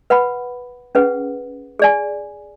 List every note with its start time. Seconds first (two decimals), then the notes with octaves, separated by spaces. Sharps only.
0.10 B4 F#5 B5
0.95 C#4 G#4 B4 F#5
1.79 G#4 D5 G#5